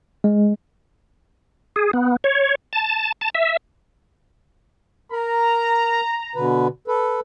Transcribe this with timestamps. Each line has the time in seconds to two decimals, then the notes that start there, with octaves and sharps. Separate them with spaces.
0.24 G#3
1.76 G#4
1.93 B3
2.24 C#5
2.73 A5
3.21 A5
3.35 E5
5.12 A#4 A#5
6.36 B2 D3 B4
6.88 A4 B4